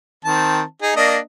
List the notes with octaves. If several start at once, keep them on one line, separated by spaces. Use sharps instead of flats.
D#3 C4 A5
D#4 G#4
A#3 D4 D#5